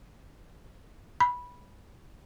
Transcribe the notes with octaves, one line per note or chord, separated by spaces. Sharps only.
B5